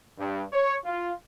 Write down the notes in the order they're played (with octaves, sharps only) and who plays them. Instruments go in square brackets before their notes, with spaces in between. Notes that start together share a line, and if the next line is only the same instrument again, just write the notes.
[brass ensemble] G2
C#5
F4